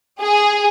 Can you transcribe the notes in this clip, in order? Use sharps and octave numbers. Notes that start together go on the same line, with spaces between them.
G#4